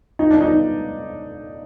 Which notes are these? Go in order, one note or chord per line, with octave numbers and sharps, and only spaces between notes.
D#4
D4
D#4